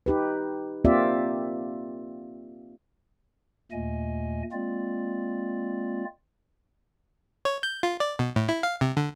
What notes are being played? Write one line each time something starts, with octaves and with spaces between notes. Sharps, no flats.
D#4 G4 B4
A#3 C4 F4 G4 D5 E5
D#2 A#2 A3 D#5 G#5
G#3 A#3 C4 F4 D5
C#5
G6
F4
D5
B2
A2
E4
F5
C3
D3